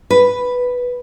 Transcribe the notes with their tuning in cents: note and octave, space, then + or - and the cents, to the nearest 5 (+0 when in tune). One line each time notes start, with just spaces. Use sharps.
B4 +0